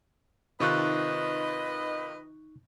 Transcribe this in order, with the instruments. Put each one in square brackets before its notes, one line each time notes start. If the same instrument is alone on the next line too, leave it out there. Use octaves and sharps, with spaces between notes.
[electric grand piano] C3 D#3 F4 [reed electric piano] D#4 C#6 F#6 [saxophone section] B4 D#5